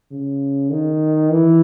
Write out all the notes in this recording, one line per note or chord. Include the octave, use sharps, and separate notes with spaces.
C#3
D#3
E3